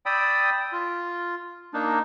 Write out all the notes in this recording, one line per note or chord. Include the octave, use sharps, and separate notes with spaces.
D5 G5 B5 D#6 E6
F4
A#3 D4 D#4